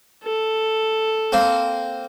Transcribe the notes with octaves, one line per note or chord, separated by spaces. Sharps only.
A4
A#3 C4